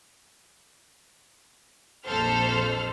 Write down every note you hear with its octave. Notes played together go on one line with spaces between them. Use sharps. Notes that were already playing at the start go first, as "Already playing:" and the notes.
A#1 F2 A4 C5 F6